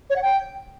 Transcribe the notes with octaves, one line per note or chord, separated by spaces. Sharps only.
C#5
F#5
G5